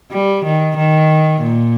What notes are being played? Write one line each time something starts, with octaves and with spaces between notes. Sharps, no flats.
G3
D#3
D#3
A#2